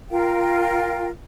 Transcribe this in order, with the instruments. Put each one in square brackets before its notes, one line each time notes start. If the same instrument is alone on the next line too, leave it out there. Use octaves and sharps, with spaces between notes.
[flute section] F4 A#4 F5 G5